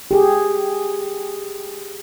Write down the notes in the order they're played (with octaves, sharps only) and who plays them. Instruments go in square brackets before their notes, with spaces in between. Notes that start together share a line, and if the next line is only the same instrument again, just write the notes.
[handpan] G4 G#4